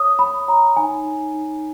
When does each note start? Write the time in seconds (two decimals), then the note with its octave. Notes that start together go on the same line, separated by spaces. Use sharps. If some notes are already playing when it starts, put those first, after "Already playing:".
Already playing: C#5 D#6
0.19 C#5 B5
0.48 C#5 A#5
0.77 D#4 G#5
1.05 D#4
1.34 D#4